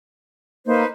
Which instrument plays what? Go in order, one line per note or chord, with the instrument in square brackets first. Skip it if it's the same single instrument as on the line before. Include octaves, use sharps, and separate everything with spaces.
[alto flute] A#3 [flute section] D#4 B4 C5